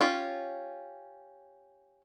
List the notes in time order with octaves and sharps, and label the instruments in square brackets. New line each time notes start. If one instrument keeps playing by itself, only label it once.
[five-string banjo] C#4 F4 G4